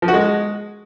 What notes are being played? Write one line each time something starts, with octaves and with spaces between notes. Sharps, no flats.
F3
F#4
G#3